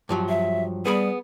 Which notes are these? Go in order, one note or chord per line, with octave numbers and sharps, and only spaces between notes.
G2 F3 F#3
E5
G3 B3 G#4 B5